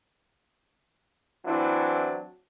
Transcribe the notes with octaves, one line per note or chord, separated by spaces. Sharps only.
E3 F#3 C4 D4 E4